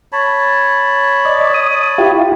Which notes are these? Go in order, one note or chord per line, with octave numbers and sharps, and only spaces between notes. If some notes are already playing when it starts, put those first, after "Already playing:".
C#5 A5 B5
D5 D#5
D#6
E4 F4 G4